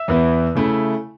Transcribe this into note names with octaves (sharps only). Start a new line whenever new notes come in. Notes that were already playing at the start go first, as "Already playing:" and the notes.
Already playing: E5 E6
E2 E3 B3 E4
C#3 A3 E4